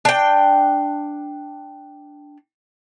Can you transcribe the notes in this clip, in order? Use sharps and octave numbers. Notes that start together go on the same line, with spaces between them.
D4 G5